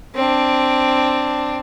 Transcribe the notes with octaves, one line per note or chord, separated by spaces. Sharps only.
C4 D4